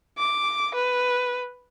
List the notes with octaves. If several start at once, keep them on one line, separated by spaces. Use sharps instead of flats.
D6
B4